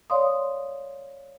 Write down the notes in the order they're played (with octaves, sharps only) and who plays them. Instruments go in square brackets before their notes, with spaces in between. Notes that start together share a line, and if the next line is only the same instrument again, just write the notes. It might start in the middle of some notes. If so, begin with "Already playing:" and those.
[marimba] C#5 D5 F5 C6 D#6